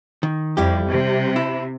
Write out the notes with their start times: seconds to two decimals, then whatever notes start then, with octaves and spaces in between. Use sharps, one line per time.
0.23 D#3
0.57 F2 G3 E4 G4
0.89 C3
1.36 E4